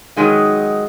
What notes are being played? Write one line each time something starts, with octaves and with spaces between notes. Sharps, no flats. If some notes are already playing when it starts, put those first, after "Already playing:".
D#3 F#3 G#3 D#4